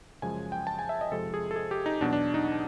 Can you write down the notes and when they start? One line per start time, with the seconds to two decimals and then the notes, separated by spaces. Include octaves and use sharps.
0.22 F#2 C#3 F3 G#3 G#5
0.52 G5
0.67 A5
0.79 G#5
0.89 E5
1.01 D#5
1.12 F2 C3 F3 G#3 A4
1.34 G#4
1.51 A4
1.56 G#4
1.71 G4
1.86 D#4
2.01 E2 B2 F#3 D4
2.13 D4
2.34 D#4